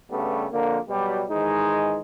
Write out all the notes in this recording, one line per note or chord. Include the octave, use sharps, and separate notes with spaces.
G2 C#3 G3 A3 B3
F2 D3 A#3
B2 F#3 G3
G#2 D#3 E3 G#3 D#4